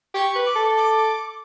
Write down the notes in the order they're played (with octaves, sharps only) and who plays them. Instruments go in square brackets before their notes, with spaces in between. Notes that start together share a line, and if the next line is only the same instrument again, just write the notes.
[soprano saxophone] G4 [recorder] C#6
[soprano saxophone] B4
[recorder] D6
[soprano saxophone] A4
[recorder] D6